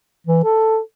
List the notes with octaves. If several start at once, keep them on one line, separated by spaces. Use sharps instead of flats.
E3
A4